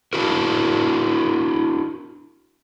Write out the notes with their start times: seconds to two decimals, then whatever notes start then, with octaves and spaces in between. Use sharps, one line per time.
0.13 D4 E4 F#4 A#4